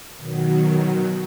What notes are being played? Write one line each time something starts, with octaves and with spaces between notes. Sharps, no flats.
B2 D#3 F#3